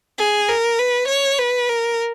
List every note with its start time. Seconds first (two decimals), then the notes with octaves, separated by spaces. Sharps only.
0.18 G#4
0.49 A#4
0.79 B4
1.08 C#5
1.38 B4
1.69 A#4